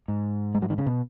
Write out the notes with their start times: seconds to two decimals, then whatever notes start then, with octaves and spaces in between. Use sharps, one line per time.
0.08 G#2
0.55 G#3
0.62 F#3
0.70 D#3
0.78 C#3
0.86 B2